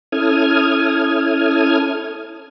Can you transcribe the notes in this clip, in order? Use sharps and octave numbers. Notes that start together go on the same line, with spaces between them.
C#4 E4 A4 D#6 F6 G#6